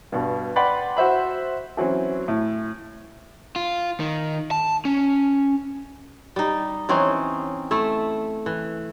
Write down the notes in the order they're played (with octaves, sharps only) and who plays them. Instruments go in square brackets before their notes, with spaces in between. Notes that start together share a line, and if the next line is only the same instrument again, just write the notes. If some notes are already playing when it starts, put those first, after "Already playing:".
[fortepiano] G2 B2
B4 D5 F#5 G5 B5 C6
F#4 C5 E5 B5
E3 F#3 C4 C#4
A2
[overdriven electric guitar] F4
D#3
A5
C#4
[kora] G3 D#4
E3 C4 C#4 D#4
A3 E4 E5
E3